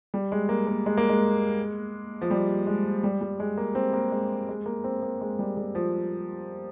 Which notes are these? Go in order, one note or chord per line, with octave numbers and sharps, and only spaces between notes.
G3
G#3
A#3
A#3
G#3
A#3
G#3
F3
G3
G#3
G3
G3
G#3
A#3
C4
A#3
G#3
G#3
A#3
C4
A#3
G#3
G3
G3
F3